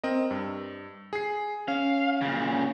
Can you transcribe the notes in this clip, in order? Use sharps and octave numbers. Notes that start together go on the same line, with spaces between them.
C4 A#4 D#5
G2
G#4 C7
C#4 F5
A#2 C#3